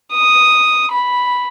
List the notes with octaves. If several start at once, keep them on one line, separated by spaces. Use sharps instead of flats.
D#6
B5